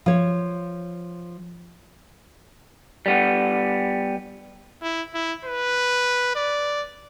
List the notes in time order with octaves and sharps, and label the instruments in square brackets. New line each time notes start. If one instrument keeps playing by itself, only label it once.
[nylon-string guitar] F3 C#5
[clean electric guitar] G3 B3
[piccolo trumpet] E4
E4
B4
D5